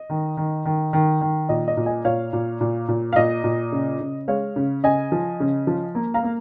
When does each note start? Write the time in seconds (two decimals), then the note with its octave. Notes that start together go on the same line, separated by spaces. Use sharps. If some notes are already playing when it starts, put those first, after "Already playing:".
Already playing: D#5
0.10 D#3
0.37 D#3
0.65 D#3
0.93 D#3
1.21 D#3
1.49 A#2 D#5
1.68 D#5
1.77 A#2
1.86 D#5 G#5
2.05 A#2 C#5 F5
2.33 A#2
2.61 A#2
2.88 A#2
3.13 F5
3.16 A#2 D#5
3.44 A#2
3.72 C#3
4.00 C#3
4.28 G#3 C#5 F5
4.56 C#3
4.83 C#3 D#5 G#5
5.12 F3
5.40 C#3
5.67 F3
5.95 A#3
6.14 F5 A#5
6.23 A#3